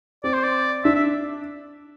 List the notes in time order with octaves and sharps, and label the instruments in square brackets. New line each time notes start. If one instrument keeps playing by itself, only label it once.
[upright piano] C4 [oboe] D5
[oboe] C5
D5
[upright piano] D4 [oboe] E5
[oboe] E5